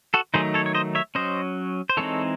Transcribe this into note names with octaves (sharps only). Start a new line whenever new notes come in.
F#4 A4
D#3 F#3 A3 D#4 G#4 C5
A4 C#5
C#5
C5 D#5
C#5 E5
F#3 C#4 C5 D#5
C5
E3 G#3 C4 D#4 A4 C#5